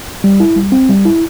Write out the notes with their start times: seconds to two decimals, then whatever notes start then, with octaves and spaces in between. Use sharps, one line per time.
0.24 G3
0.40 E4
0.56 G3
0.72 C4
0.89 G3
1.05 E4